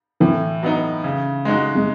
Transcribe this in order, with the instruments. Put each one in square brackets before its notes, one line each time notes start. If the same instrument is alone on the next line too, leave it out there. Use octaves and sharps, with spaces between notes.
[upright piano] A2 [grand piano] E3
[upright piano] F#3 B3 D#4
C#3
G#3 D#4 F#4
[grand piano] G#3